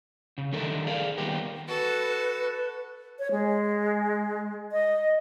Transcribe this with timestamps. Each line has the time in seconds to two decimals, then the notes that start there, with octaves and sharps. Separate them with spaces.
0.38 C#3
0.53 D3 D#3 G3 A3 A4 A#4
0.87 G#4 D5 F5
1.18 D#3 G3 B3 G4 A#4
1.68 F#4 A4 B4
3.19 C#5
3.31 G#3
4.72 D#5